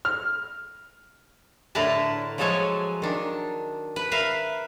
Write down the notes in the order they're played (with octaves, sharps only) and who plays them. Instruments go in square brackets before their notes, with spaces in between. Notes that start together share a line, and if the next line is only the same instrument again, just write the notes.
[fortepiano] F6
[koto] A2 D3 E4 A#4 B4 A5
F3 F#3 G#3 A4 C#5 G#5
D#3 D4
B4
A#4 B4 E5 F5